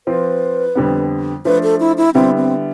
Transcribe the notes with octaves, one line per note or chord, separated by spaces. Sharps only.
F3 C4 F4 B4
F2 D3 G3 B3
F3 A3 D4 B4
A4
E4
E4
D3 G3 B3 C4 E4
C4